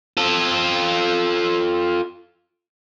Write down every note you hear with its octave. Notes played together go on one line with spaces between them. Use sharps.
F4 A4